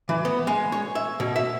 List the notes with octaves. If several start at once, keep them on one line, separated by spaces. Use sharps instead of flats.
E3
B3
G#3
C#5
E5
B2
E5